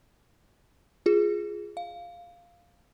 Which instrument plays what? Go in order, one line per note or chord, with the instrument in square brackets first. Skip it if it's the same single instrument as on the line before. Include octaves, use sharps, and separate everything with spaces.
[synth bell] F4 G#4
F5